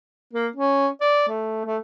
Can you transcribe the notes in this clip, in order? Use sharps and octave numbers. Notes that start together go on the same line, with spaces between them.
A#3
C#4
D5
A3
A3